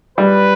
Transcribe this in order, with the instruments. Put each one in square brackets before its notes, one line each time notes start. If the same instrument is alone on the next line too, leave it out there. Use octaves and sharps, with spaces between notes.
[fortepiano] G3 [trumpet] B4